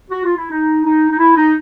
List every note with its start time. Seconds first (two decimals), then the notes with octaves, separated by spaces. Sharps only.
0.10 F#4
0.25 F4
0.37 E4
0.50 D#4
0.85 D#4
1.10 D#4
1.18 E4
1.36 D#4